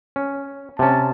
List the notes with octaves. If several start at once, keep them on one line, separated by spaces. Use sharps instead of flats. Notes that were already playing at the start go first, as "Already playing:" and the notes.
C#4
C3 C#4 A5